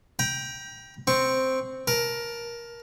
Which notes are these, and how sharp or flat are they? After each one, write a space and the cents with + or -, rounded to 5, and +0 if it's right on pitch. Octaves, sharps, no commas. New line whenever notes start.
G5 +0 A#5 +35
C4 +0 C#6 +0
A#4 +15 A5 +0